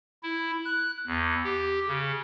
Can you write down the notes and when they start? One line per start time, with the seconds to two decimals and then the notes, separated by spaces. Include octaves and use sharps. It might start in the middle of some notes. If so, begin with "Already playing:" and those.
0.23 E4
0.65 F#6
1.07 E2
1.44 G4
1.87 C#3